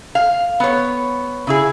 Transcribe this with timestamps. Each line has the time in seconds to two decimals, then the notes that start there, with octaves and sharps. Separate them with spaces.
0.15 F5
0.60 B3 C#5
1.47 C#3 E4 G#4